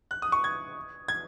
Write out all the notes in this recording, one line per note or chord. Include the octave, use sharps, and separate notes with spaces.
F#6
D#6
C#6
G#6
G#6